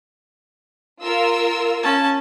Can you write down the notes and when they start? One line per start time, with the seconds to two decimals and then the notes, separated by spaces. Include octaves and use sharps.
1.03 F4 A#4 E6
1.83 C#4 A5